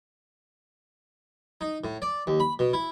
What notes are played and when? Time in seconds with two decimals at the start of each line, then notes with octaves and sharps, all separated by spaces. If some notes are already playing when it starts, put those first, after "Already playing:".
1.61 D#4
1.84 A2
2.02 D5
2.27 D#2
2.40 B5
2.59 B2
2.73 E4